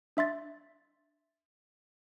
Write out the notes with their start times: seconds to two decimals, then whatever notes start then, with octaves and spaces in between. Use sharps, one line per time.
0.17 D4 E5 C6 A6